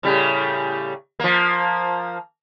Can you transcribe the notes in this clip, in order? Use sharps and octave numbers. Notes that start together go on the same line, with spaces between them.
A2 C#3 G3
F3 A#3